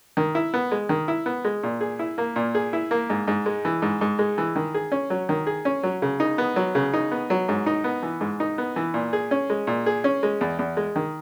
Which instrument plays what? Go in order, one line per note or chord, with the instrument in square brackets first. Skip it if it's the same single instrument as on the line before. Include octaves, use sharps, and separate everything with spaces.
[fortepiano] D#3
E4
B3
G#3
D#3
E4
B3
G#3
A#2
G#4
E4
A#3
A#2
G#4
E4
A#3
G#2
G#2
G#3
E3
G#2
G#2
G#3
E3
D#3
G#4
C#4
F#3
D#3
G#4
C#4
F#3
C#3
D#4
B3
F#3
C#3
D#4
B3
F#3
G#2
D#4
B3
E3
G#2
D#4
B3
E3
A#2
G#4
C#4
G#3
A#2
G#4
C#4
G#3
E2
E2
G#3
D#3